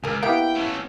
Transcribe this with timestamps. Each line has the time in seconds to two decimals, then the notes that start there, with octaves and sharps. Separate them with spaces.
0.04 C#2 A#4 G#5
0.23 A#3 B3 E4 G4 E5 F5 G5
0.55 A3 C#4